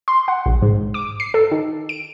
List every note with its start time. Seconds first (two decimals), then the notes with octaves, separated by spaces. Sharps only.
0.08 C6
0.28 F#5
0.46 A#1
0.62 G#2
0.94 D6
1.20 C7
1.34 A4
1.52 D#3
1.89 D7